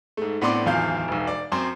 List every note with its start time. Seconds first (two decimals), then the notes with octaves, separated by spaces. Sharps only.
0.17 G#2 A3
0.41 A2 B3 C4 D4 C6 D6
0.66 D1 G#1 E2 F4 F5 G6
1.08 E1 B1
1.27 D5
1.52 F#2 C4 C6